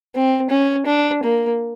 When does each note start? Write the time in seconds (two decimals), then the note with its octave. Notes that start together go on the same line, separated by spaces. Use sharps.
0.15 C4
0.50 C#4
0.86 D4
1.23 A#3